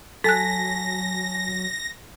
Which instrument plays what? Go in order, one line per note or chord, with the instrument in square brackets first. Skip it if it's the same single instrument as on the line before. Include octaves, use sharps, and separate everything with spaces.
[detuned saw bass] F#3 [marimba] A4 F#6 [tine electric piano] G#5 A5 B6 [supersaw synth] A#6